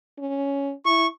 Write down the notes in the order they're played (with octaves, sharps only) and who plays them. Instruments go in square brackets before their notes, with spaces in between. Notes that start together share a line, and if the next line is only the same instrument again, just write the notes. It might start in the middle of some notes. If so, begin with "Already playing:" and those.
[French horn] C#4
[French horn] E4 [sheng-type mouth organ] C#6